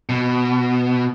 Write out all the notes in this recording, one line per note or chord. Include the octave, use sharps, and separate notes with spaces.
B2